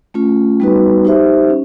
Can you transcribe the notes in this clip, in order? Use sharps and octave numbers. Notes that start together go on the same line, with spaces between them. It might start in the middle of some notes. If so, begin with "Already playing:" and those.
A3 C#4 F4
G3 B3 D#4 F#4 B4
D#4 G4 C5 E5
C#4